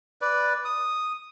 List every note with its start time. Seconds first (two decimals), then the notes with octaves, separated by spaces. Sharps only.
0.21 B4 D5
0.65 D#6